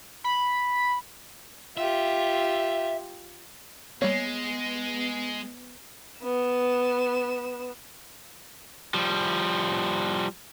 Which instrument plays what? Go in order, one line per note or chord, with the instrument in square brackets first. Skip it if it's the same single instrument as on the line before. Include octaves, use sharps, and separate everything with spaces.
[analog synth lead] B5
[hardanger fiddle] F4 G4 [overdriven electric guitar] E5
[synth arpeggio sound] G3 A#3 [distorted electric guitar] G#3 [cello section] B3 [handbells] C#5
[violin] B3 E7
[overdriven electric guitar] F3 G3